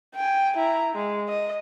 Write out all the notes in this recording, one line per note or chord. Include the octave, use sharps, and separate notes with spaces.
G5 G#5
E4 A#5
G#3
D#5